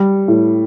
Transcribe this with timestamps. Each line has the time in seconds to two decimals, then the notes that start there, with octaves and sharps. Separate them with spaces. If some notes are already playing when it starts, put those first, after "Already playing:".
Already playing: G3
0.28 A2